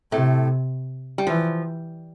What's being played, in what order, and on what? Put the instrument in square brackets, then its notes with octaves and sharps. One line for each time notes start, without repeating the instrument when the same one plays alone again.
[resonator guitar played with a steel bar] A2 A3 [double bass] C3
[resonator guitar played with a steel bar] G3
[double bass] E3 [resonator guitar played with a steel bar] F3